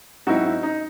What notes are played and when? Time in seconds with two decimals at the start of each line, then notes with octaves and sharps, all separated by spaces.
0.27 G#2 F#3 C4 D#4 E4 F#4
0.45 D#4
0.63 D#4